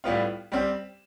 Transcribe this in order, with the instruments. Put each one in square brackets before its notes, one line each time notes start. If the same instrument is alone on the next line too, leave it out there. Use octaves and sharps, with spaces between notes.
[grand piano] A2 G3 B3 F4
G3 C4 G4